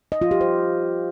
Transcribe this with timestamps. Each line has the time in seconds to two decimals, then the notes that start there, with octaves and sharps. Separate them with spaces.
0.12 D#5
0.22 F4
0.31 G4
0.41 C5